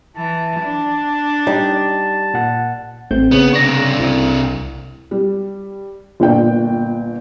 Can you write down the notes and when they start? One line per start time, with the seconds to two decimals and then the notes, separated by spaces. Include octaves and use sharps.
0.16 E3 A5
0.60 D4
1.47 G3 D#4
2.34 A#2 F#5
3.11 A1 A3 C4 G6
3.31 C#3 B3
3.53 C3 D4 C#6 A#6
4.00 C2 E4
5.11 G3
6.20 G1 A#2 G5